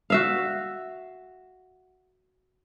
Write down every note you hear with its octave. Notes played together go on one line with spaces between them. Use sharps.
F#4 E5 F5